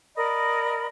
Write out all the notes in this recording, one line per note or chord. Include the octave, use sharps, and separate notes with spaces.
A#4 D5 D#5 B5